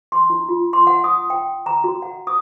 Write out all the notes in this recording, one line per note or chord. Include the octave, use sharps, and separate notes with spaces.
C6
E4
F4
C6
F#5
D#6
G5
A#5
F#4
F#5
D#6